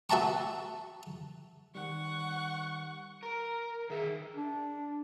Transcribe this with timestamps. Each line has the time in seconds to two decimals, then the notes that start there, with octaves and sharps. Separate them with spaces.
0.10 F#4 E5 A5 A#5 C#6
1.75 D#3 G3 F#5 C#6
3.23 A#4 A#5
3.90 D#3 G#4 E5
4.36 D4